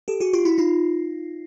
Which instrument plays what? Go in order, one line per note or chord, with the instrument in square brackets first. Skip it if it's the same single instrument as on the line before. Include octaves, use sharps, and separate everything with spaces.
[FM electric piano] G4 A4
F#4 G#4
F4 G4
E4 F#4
D#4 F4